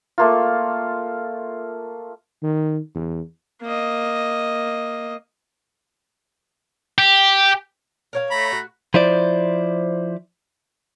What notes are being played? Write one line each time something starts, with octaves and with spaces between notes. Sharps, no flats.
A3 A#3 F4
D#3
E2
A#3 D#5
G4
A#4 C#5 F5
A3 A#5 B5
F#4
F3 E4 C5 D5